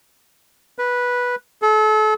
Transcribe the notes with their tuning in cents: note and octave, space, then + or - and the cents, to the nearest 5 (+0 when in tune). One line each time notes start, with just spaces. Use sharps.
B4 -10
A4 -35